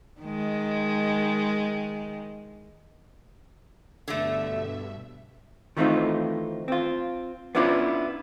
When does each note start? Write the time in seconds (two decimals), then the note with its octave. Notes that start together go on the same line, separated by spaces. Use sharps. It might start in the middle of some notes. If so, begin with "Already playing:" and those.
0.21 D#3 G#3
4.08 G2 B2 D3 A3 E5
5.77 D#3 E3 A3 C4 D#4 F4
6.68 C4 F4
7.55 B3 C#4 D4 E4 F4 B4